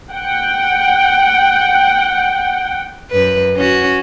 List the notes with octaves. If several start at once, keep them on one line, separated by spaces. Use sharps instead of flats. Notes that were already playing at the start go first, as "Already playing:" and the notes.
F#5 G5
F#2 B4
C#4 F#4